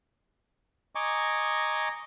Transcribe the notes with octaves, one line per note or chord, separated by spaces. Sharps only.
D#5 G#5 A#5 C#6 D6